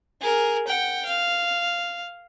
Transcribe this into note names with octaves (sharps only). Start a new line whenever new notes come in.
G#4 A#4
F#5 G5
F5